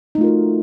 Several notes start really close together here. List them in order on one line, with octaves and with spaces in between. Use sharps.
D#4 A3 F4 A#4 F#4